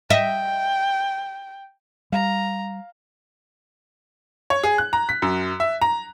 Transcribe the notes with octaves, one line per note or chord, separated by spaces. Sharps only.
D#5 E5 G5
G3 F5 A#5
C#5
G#4
F#6
A#5
B6
F#2
E5
A#5